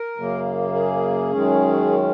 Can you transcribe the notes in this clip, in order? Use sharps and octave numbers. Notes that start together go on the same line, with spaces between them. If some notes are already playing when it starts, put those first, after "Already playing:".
Already playing: A#4
F#2 C#3 A#3
G#4
F#2 D#3 G#3 C#4